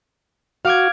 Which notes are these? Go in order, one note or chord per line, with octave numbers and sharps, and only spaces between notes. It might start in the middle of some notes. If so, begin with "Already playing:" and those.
F#4 F5 D6 G#6